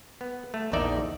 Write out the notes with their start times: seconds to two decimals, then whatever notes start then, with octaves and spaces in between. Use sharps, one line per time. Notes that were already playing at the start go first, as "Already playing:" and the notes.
0.21 B3
0.54 A3
0.72 A#1 E2 D#3 D#4 D5 E5